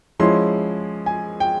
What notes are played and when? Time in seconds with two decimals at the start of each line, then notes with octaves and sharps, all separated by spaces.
0.19 F3 G#3 C#4 E4 C6
1.06 G#5
1.40 G5